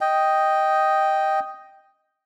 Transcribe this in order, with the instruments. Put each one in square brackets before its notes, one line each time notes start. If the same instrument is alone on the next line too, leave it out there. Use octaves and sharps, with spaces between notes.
[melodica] D#5 G5